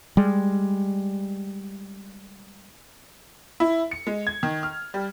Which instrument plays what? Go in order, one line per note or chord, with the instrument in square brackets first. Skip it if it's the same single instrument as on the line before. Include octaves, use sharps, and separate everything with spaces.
[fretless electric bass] G3 G#3
[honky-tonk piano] E4
C#7
G#3
G#6
D#3
F6
G3